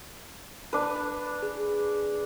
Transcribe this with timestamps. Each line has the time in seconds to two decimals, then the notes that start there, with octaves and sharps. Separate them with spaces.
0.73 D4 B4
1.43 G#4